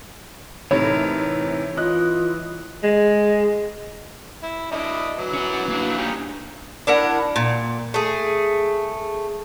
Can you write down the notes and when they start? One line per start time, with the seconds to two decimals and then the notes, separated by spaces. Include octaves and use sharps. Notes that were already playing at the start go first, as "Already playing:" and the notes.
0.71 A2 C3 E3 C4 D#4 A#4 C#5
1.77 E3 F4 D#5 F#6
2.83 G#3
4.43 E4
4.72 D4 E4 D#5
5.18 E3 F#3
5.34 C#4 F#5
5.68 A#3 D4
5.98 G3 C#4 D#4
6.87 D4 E4 A#4 F#5
7.36 A#2
7.94 A3 G#4